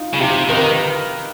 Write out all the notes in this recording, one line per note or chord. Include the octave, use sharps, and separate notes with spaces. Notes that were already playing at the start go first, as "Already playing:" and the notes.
Already playing: D#4 F4
C#3
C3 F4 G4
D#3 B4
A#4